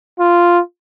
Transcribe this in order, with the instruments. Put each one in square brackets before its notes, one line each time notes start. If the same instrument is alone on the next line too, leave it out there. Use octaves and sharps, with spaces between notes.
[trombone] F4